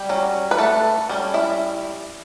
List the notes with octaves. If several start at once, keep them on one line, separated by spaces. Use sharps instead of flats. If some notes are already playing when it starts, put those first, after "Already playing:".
Already playing: G3 G4
F#3 C#4
B4
A3 A4
G3 C#4
E4 E5